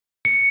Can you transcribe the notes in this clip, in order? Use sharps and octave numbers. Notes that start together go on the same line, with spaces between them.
C#7